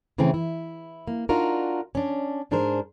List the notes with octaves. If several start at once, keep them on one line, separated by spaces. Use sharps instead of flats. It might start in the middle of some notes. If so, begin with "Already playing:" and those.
C#3 E3 A3 C4 C#4
E4
A#3
D4 D#4 F4 F#4 A#4
C#4 D4
G#2 D4 G#4 A#4 C5